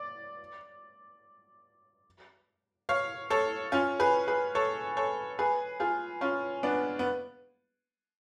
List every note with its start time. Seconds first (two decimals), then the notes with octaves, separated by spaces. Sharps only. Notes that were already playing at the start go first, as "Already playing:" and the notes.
Already playing: D5
2.89 C#5 F5
3.30 A4 C#5
3.72 C#4 F4
4.00 G#4 B4
4.28 G#4 B4
4.55 A4 C#5
4.97 A4 C#5
5.39 G#4 B4
5.80 F4 G#4
6.21 C#4 F4
6.63 B3 D4
6.99 B3